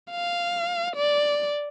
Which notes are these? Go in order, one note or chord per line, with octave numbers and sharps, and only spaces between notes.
F5
D5